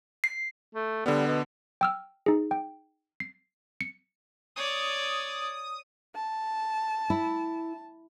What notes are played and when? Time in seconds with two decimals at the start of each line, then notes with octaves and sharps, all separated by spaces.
0.24 C7
0.75 A3
1.06 D3 G3 B3
1.27 B2
1.81 G5 E6 F6
2.26 D#4 G#4
2.51 G5
3.20 C7
3.81 C#7
4.56 C#5 D5 D#6
6.15 A5
7.10 E4